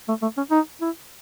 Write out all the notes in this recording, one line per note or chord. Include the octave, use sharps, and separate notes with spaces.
A3
A3
C#4
D#4
E4